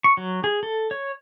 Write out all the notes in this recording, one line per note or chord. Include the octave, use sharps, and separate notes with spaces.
C#6
F#3
G#4
A4
C#5